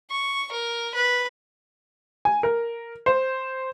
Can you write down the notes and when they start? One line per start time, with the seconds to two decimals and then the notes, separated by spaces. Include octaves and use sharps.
0.10 C#6
0.52 A#4
0.95 B4
2.25 G#5
2.43 A#4
3.06 C5